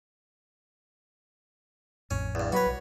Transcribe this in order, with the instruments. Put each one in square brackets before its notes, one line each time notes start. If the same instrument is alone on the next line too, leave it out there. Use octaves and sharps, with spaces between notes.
[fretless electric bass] A1 F2 A2 [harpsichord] C#4
[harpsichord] E2 G2
[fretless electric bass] F#3 [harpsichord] F#4 C#5 [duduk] B4
[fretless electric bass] B1